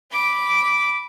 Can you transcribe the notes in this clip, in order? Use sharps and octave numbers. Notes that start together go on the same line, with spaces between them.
B5 D6